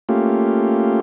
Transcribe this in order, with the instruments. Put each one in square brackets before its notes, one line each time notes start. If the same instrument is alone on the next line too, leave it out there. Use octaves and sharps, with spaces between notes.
[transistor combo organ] A3 A#3 C#4 F4 G4